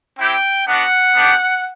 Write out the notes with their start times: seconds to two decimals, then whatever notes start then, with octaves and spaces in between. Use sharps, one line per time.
0.18 C4 E4 G4 G5
0.67 B3 D4 F#4 F#5
1.16 B3 D4 G4